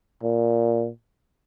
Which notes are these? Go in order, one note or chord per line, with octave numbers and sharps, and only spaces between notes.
A#2